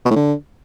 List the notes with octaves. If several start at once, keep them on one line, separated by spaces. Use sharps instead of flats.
B2
A2
D3